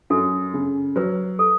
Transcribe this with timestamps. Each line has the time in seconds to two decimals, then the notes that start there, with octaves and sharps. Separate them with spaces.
0.10 F#2 A4
0.54 C#3
0.96 F#3 B4
1.39 A4